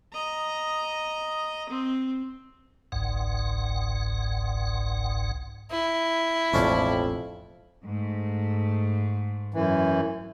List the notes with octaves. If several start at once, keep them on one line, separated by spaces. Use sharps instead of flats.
D#5 A#5
C4
G1 C2 G#2 F#5
E4
E1 A1 F2 C#4 D4 C5
G#2 A3
F#2 E3